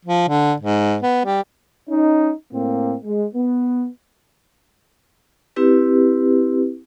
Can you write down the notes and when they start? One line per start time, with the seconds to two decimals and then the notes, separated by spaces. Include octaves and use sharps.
0.05 F3
0.29 D3
0.60 G#2
1.03 B3
1.26 G3
1.89 C#4 D#4
2.52 A2 A#3 C4
3.04 G#3
3.34 B3
5.56 C4 E4 G4 B4